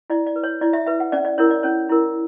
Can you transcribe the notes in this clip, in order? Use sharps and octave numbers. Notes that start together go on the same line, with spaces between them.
E4 D5
D5
B4
C#5
E4 D5
E5
B4 E5
F#5
C#4 D5
D5
E4 A#4 C#5
D5
C#4 C#5
E4 A#4